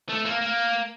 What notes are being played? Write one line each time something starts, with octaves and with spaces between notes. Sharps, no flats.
A3
A#3
A#3